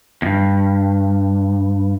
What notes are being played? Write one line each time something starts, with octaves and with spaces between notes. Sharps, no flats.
E2 G2